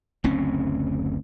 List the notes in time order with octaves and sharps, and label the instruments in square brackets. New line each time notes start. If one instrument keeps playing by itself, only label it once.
[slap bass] F#1 D2 C4 C#4